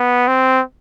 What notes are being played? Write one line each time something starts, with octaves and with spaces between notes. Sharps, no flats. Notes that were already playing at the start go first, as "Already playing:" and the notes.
Already playing: B3
C4